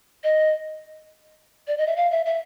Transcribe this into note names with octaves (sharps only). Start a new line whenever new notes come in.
D#5
D5
D#5
E5
F5
E5
E5